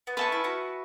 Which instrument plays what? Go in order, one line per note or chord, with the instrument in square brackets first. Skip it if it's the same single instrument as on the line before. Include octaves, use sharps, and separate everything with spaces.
[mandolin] B3
[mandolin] C#4 [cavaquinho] B4 E5 A5 C#6
[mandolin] E4
F#4